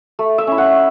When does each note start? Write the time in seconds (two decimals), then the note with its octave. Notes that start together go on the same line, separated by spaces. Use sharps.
0.19 A3
0.38 E5
0.47 C#4 E4
0.58 F#5